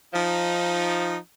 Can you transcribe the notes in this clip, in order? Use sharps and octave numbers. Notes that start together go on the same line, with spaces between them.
F3 D#4